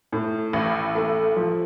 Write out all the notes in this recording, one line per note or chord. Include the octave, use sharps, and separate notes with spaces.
A2
A1
A3
F3